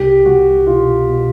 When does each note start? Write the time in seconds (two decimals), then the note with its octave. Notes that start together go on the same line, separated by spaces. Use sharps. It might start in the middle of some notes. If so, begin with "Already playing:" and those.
Already playing: C2 G4
0.25 C2 F#4
0.66 B2 F4
1.07 B2